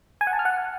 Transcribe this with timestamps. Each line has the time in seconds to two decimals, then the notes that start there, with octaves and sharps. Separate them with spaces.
0.21 G#5
0.27 F#5
0.33 A5
0.39 F6
0.45 F#5